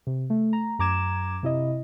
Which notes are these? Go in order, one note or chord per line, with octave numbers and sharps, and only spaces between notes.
C3
A3
A#5
F#2 A#5 D6 G#6 E7
C3 E4 D#5